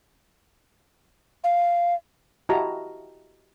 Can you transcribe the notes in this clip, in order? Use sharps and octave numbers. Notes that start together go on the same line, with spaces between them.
F5
E4 F#4 G4 D#5 A5 A#5